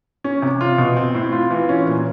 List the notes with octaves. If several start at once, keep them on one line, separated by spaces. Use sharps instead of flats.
C#4
C3
F4
B2
C4
A2
F4
E3
C#4
A#2